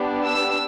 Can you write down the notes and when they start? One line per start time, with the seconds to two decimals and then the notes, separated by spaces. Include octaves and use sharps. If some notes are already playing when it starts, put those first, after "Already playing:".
Already playing: B3 D4 G4
0.25 E6